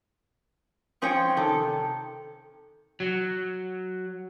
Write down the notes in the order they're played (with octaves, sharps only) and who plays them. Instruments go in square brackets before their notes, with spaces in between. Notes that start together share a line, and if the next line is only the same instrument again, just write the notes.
[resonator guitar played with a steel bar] F3 C4 C#4 C#5 G5
C3 D#3 A4
[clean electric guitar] F#3